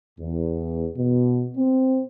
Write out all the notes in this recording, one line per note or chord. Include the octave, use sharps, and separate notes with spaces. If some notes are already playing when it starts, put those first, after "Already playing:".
E2
B2
C4